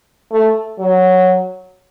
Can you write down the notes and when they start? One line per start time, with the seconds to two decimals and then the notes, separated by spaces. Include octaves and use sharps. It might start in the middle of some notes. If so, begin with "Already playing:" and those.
0.32 A3
0.79 F#3